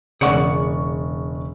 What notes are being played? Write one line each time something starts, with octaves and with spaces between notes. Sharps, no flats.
E1 C#3 G#4 D5 F#5 C#6 C#7